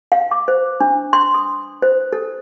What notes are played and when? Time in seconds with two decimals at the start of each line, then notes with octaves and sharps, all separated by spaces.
0.12 F5
0.31 D6
0.48 C5
0.80 D4
1.13 C6
1.34 D#6
1.82 C5
2.13 A4